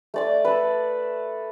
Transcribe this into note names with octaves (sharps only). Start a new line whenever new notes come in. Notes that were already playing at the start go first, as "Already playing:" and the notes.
A3 D5 D6
A4 B4